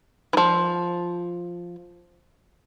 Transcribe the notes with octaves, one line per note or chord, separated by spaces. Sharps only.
E3 F3